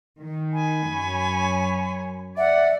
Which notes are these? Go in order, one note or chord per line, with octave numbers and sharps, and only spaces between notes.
D#3
G#5 B5
F#2 C#5
D5 E5 F#5